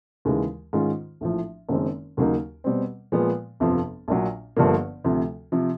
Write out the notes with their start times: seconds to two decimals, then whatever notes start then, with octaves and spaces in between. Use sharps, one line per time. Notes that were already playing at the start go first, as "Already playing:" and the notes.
0.25 D#2 C#3 E3 G#3
0.73 G#2 D#3 G#3 C#4 F4
1.21 A#1 A2 F3
1.69 F#1 F#2 D#3 G#3 C4
2.17 D#2 C#3 F#3 A#3 D#4
2.64 B2 G3 C4
3.12 A#2 F3 G#3 B3
3.60 G1 F2 C3 F3
4.08 A#1 A#2 F#3
4.57 G1 G2 D3 F3 A#3
5.04 D2 C3 F3
5.52 C3 F3